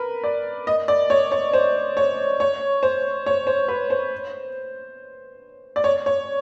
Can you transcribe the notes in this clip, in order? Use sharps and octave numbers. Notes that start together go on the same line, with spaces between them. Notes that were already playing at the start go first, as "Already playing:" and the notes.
Already playing: A#4 B4
D5
D#5
D5
C#5
C#5
C5
C#5
C#5
C5
C#5
C5
B4
C5
D5
C#5
C#5